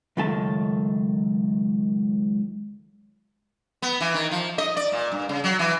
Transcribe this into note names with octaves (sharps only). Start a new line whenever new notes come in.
C#2 F#2 D#3 A3 A5
B3
E3
D#3
F3
D#5
D5
A#2
G2
C#3
F#3
E3